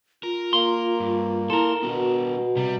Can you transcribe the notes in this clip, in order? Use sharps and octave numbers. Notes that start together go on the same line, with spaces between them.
F4 A#4
A#3 C6
G2
E4 A4 A#4 C6
B2 B3 D4 F#4
C3 G3